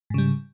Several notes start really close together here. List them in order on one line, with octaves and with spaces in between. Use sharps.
G#2 C#3 G3